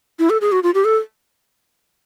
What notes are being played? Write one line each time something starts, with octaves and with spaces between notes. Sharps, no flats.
E4
A4
G#4
F#4
F4
G4
A4